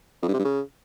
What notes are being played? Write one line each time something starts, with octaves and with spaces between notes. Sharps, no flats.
F2
G2
C3
G2
C#3